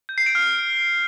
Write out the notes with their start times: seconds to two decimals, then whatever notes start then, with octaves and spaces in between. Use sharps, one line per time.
0.09 G6
0.18 C7
0.26 D7
0.35 F6